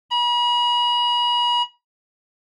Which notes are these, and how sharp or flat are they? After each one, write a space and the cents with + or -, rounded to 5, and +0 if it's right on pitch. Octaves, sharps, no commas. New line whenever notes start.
B5 -40